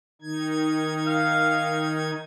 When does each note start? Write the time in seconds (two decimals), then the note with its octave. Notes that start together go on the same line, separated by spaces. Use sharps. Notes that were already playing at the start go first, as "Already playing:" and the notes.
0.22 D#3 D#4 G#6
1.06 F5